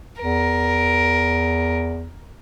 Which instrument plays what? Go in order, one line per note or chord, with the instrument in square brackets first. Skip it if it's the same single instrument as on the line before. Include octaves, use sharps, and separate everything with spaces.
[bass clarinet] E2 [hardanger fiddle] A#4